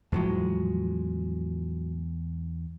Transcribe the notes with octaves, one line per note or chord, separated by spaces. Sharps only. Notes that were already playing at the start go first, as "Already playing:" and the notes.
E2 A2 F3 F#3 G#3